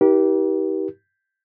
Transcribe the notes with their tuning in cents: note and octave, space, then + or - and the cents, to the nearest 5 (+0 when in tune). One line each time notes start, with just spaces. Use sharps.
D#4 +45 G4 -15 A#4 +45